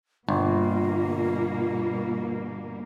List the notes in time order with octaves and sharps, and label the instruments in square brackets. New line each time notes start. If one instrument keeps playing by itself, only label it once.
[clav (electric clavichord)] G1 [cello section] B2 G3 A#3 [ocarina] F4